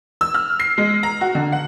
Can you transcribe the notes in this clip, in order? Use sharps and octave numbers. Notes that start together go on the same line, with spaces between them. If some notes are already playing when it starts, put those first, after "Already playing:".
E6
F6
C7
G#3
A#5
F#4
D3
F#5